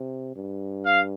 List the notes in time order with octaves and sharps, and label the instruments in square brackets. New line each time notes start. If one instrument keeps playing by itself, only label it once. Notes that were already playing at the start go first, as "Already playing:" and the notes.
Already playing: [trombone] C3
G2
[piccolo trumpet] F5